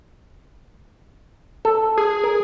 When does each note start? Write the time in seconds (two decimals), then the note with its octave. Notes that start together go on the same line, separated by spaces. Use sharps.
1.65 A4
1.97 G#4
2.24 A#4